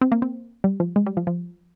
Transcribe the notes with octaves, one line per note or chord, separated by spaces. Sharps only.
C4
A#3
C4
G3
F3
G#3
G3
F3
F3